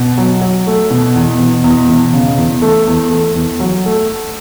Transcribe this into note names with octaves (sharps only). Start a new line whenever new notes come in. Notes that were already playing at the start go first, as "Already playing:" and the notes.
Already playing: B2
F#3
F#3
A3
B2
E2
B2
E2
B2
C#3
E2
A3
E2
A3
E2
F#3
A3